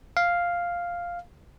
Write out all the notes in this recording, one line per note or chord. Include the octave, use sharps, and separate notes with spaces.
F5